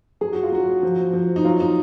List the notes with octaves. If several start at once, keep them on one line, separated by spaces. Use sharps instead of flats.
F#3 G#4
F#4
F4
F#3 F#4
F3
F3
D#4
F#3 F4
D#4